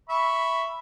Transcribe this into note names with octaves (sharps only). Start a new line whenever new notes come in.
E5 B5 C#6